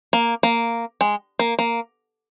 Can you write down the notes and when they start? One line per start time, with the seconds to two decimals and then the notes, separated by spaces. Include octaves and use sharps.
0.13 A#3
0.43 A#3
1.01 G#3
1.39 A#3
1.59 A#3